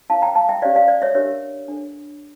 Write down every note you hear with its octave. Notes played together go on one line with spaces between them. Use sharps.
C#4 E4 A#4 C#5 F5 A5
G5 A#5
F5 A5
E5 G5
C#4 G4 C#5 D5 F5
D5 F5
D5
C#5 E5
D4 G4 A#4 C#5 E5
D4 A4 C#5